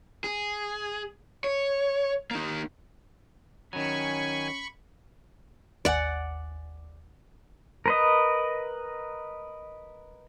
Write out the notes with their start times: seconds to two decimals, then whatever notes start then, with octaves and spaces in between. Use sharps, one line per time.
0.24 G#4
1.44 C#5
2.31 A#3 D#4
3.73 D#3 F#3 C#4 G#5 B5 C#6
5.85 G#1 D#2 D5 F#5 G#5
7.86 A#4 B4 D#5